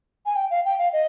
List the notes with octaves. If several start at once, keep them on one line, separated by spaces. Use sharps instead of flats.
G#5
G5
F5
G5
F5
D#5